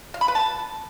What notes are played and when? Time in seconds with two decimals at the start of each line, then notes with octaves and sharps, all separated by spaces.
0.14 F5
0.21 B5
0.28 B4
0.35 A5